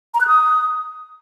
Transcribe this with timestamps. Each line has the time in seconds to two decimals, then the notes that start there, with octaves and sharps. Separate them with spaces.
0.14 A#5
0.21 F#6
0.27 D#6